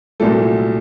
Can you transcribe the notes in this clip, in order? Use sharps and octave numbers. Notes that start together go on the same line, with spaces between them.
C2 A#2 F#3 A3 A4